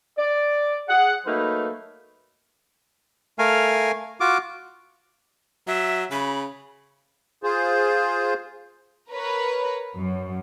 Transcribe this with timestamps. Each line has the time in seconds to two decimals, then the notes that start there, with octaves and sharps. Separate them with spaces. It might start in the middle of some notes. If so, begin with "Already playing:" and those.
0.18 D5
0.89 G#4 F#5
1.26 F#3 A3 A#3 D#4 B4
3.39 A3 A#4 F5 G#5
4.20 F4 F#4 D6
5.67 F#3 E5
6.11 C#3 B5
7.43 F4 G#4 C5
9.10 A#4 B4 C#5
9.96 F#2